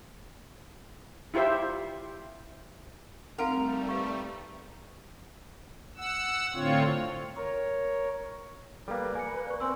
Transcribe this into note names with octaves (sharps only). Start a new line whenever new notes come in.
E4 F4 G4 C5 E5
G3 A3 C4 D#4 A#4 F5 F#5
B4 F5 C#6
F#5 E6
A2 D3 C4 F4 C#5
A#4 C#5
G3 A#3 A4 B4
A#3 G#5 C#7
D5 C#6
C4 G#5 C6 E6